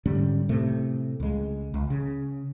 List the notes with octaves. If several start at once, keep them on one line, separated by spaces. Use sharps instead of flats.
G#2 D3 G3 C#4
A2 C3 A3
C#2 G#3
C#2
C#3